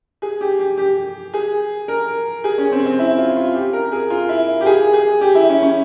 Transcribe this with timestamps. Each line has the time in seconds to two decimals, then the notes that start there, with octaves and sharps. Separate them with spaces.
0.22 G#4
0.41 G4
0.59 G4
0.78 G4
1.34 G#4
1.88 A#4
2.44 G#4
2.58 C#4
2.72 C4
2.86 C4
2.99 E4
3.18 F4
3.36 F4
3.55 G4
3.73 A#4
3.92 G#4
4.10 F4
4.29 E4
4.61 G4
4.66 G#4
4.93 G#4
5.21 G4
5.35 E4
5.49 C#4
5.63 C#4